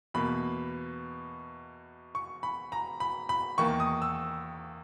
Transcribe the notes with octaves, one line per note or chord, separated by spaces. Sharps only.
E2 B2 A#3 B5
C#6
B5
A#5
B5
B5
E2 D#3 A#3 C#6
D#6
E6